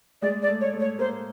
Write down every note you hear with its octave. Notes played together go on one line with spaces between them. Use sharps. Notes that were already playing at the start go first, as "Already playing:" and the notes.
G#3 D5
D5
A3
C#5
A3
C#5
A#3 C5